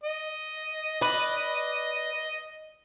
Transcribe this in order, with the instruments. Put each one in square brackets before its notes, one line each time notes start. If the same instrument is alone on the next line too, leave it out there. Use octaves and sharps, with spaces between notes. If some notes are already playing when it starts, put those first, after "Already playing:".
[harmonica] D#5
[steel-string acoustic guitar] B4 D5